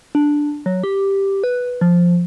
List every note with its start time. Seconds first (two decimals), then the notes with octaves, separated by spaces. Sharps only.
0.15 D4
0.66 F#3
0.84 G4
1.44 B4
1.81 F3